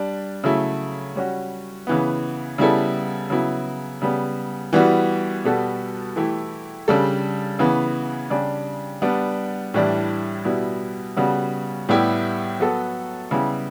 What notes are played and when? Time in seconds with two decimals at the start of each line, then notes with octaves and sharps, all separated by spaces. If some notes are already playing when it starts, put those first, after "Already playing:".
Already playing: G3 D4
0.44 C#3 F#3 A3 E4
1.16 G3 C#4 F#4
1.87 C#3 E3 B3
2.58 C#3 G3 B3 E4 A4
3.30 C#3 F#3 B3 E4
4.02 C#3 G3 B3
4.73 E3 G3 B3 F#4
5.45 B2 G3 B3 F#4 A4
6.16 E3 A3 E4 G4
6.88 C#3 G3 D4 A4
7.59 C#3 E3 B3
8.30 C#3 G3 D4 G4
9.02 G3 B3 D4
9.74 A2 E3 G3 D4
10.45 B2 G3 B3 E4
11.17 C#3 G3 B3 F#4
11.89 A2 G3 B3 E4 G4
12.60 F#3 B3 F#4 A4
13.31 C#3 G3 B3 E4 G4